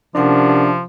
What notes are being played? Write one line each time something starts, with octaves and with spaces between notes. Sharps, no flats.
C3 F3 C#4 D4 A#4 F#5